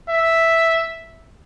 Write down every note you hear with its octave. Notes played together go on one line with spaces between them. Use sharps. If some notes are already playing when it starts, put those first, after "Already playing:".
E5